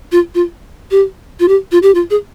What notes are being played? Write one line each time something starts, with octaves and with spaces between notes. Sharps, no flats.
F4
F4
G4
F4
G4
F4
G4
F4
G#4